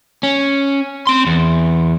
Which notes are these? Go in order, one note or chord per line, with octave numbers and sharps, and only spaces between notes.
C#4
C4 C6
E2